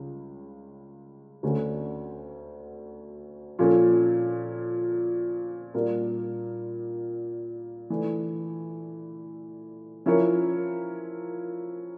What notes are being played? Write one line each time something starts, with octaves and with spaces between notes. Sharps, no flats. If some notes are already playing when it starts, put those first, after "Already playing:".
Already playing: C#2 C#3 G3
D2 D3 A3 C#4
A#2 F3 C#4 F4 A4
A#2 G3 D4 F4 A#4
E3 A3 D4
F3 C#4 E4 A#4 C#5